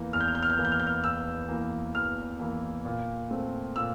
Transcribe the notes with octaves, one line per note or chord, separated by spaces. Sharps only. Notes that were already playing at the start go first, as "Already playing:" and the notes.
Already playing: E2 E3 A#3
E2 F6
G6
F6
G6
F6
G6
E3 A#3 F6
G6
F6
G6
F6
E2 E6
E3 A#3
E2 F6
E3 A#3
A#2
A3 C4
A#2 E6